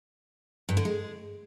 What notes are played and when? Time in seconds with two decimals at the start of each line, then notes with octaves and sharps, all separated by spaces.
0.69 G2
0.77 D3
0.85 G#3